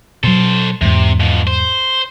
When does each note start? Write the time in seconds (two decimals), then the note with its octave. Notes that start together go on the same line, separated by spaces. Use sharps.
0.24 B2 F#3 A4 C5
0.81 E2 G#2 C3
1.20 B2 F3
1.47 C5